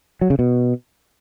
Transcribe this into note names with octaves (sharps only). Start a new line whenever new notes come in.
F#3
C#3
B2